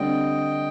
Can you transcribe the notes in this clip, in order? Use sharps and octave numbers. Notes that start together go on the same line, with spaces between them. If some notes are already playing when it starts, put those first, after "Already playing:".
Already playing: D3 G3 C4 D#5 G5